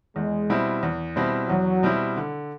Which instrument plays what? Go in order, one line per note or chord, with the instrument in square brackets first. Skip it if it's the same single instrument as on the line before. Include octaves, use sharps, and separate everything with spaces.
[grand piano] E2 [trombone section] G#3
[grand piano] B2 G3 C4 E4
E2
B2 G3 C4 E4
[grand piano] E2 [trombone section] F#3
[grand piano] B2 G3 C4 E4
D3